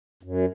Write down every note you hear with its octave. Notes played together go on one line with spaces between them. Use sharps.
F#2